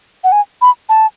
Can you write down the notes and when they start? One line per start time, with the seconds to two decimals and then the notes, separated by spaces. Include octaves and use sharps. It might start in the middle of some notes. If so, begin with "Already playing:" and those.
0.24 F#5
0.32 G#5
0.62 B5
0.89 A5